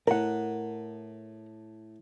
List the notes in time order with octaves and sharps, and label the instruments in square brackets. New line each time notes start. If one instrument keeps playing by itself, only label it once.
[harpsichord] A2 [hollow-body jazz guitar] A#4 F#5